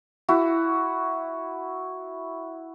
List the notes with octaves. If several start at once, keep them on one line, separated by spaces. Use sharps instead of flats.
E4 F#4